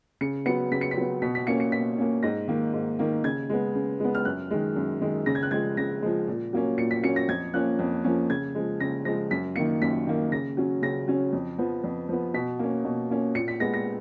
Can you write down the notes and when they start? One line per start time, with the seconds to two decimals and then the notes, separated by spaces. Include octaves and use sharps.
0.21 C#3 C#7
0.46 F#3 B3 C#7
0.71 C#3 B6
0.81 C#7
0.91 B6
0.97 F#3 B3
1.22 B2 B6
1.35 B6
1.47 A#3 C#4 C#7
1.60 C#7
1.72 B2 B6
1.98 A#3 C#4
2.23 G#2 A#6
2.48 D#3 A#3
2.74 G#2
2.99 D#3 A#3
3.24 C#3 G#6
3.50 G#3 B3
3.75 C#3
4.00 G#3 B3
4.15 F6
4.25 F#2 F#6
4.51 D#3 G#3
4.76 F#2
5.02 D#3 G#3
5.26 C#3 A#6
5.35 G#6
5.43 F#6
5.51 F3 G#3 G#6
5.77 C#3 A#6
6.02 F3 G#3
6.28 A#2
6.53 F#3 A#3 C#4
6.78 A#2 C#7
6.91 B6
7.03 F#3 A#3 C#4 C#7
7.16 A#6
7.28 F2 G#6
7.54 F3 A#3 C#4 F#6
7.79 F2
8.04 F3 A#3 C#4
8.29 C#3 G#6
8.55 F3 G#3
8.80 C#3 A#6
9.05 F3 G#3 A#6
9.30 F#2 B6
9.56 D#3 A#3 C#7
9.82 F#2 B6
10.07 D#3 A#3
10.32 C#3 A#6
10.57 F#3 C#4
10.82 C#3 A#6
11.08 F#3 C#4
11.33 F2
11.58 F3 B3
11.84 F2
12.09 F3 B3
12.34 B2 B6
12.59 A#3 C#4
12.85 B2
13.10 A#3 C#4
13.35 A#2 C#7
13.48 B6
13.60 G#3 B3 A#6
13.74 A#6